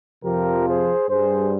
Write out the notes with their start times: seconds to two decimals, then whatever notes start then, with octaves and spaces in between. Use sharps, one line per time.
0.24 F2 C3 F3 G4 A#4
0.67 G#4 C5
1.09 G2 G3 G#4 C5